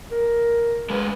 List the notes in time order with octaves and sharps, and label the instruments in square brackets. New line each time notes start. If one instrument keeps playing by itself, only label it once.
[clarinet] A#4
[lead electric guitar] G#3 B4